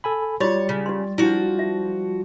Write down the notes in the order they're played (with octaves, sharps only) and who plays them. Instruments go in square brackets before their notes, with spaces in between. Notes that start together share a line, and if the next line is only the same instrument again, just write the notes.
[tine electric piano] A4 G#5 B5
[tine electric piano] G3 A6 [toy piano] F4 F#4 C6 [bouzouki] C#5
[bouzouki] C#3
[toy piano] G4 D5 C6
[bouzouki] F3 F#4 [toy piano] D4 E4
[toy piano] E5